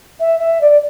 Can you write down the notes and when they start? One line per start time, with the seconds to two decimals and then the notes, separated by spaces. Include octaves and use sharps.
0.20 E5
0.39 E5
0.61 D5